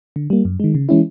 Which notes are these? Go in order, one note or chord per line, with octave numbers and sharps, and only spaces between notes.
D3
G3 A#3
F#2
D#3 G#3
C#3
E3 G#3 C#4 E4